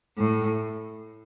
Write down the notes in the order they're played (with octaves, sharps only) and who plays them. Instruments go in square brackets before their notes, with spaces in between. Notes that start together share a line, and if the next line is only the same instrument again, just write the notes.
[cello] A2